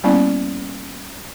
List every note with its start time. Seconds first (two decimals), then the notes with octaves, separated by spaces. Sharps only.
0.04 G3 A#3 B3 C#4 E4 D5